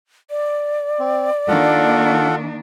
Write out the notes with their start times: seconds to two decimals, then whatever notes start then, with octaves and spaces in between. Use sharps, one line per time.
0.30 D5
0.99 C4
1.48 D#3 A#3 D4 F4 A4 F#5